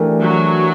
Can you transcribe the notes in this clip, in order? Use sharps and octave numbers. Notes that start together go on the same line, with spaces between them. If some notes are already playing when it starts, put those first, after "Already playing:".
Already playing: E3 A3 D4 G4 A#4
F#3